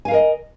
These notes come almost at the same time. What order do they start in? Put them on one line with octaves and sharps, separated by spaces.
G#5 F5 A#4 D#5